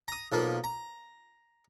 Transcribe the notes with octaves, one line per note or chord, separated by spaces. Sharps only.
A#5 D#6
B1 F3 A#3
A#5